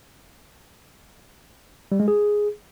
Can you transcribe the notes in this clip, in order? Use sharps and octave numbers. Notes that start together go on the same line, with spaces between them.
G3
G#3
G#4